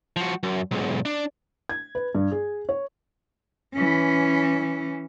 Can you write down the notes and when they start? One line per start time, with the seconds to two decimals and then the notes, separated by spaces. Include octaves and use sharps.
0.16 F3 F#4
0.43 F#2
0.71 B1 G#2
1.05 D4
1.69 G#6
1.95 B4
2.15 G2
2.31 G#4
2.69 C#5
3.74 E3 C#4